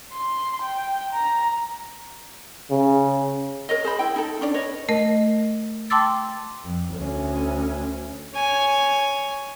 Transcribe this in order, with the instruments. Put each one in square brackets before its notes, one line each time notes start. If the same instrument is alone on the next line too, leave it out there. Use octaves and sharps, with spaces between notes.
[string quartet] C6
G5
A#5
[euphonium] C#3
[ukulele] A#4 C#5 D#5
G#4 C5 B5
E4 G5
D#4 A4
C#4 D4 D5
B4 C#5 D#5
[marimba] A3 A#4 D#5
G5 A5 C6 D6 E6 A6
[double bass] F2
D2 C#4
[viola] C#5 G#5